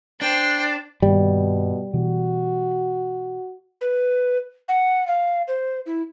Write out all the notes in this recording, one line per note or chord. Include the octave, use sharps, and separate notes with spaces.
D4 C5 G5 C7
G2 B2 D#3 G3 A#3
B2 E3 F#4
B4
F#5
F5
C5
E4